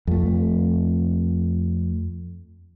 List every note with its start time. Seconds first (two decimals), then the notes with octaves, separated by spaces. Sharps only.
0.07 F2 A3